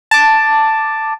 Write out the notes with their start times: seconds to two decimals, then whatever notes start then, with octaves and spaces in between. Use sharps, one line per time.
0.11 A5 D6